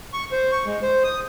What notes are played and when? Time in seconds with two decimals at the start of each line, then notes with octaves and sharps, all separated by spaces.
0.13 C#6
0.32 C5
0.52 C#6
0.66 G#3
0.82 C5
1.04 D#6